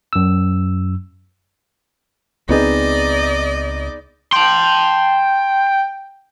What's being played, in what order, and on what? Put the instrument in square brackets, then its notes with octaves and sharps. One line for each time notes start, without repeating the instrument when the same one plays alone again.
[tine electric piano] F#2 E6
[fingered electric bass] C#2 C4 [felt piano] B3 D#4 G#4 [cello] D5 D#5
[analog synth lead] G5 [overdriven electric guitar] A5 C6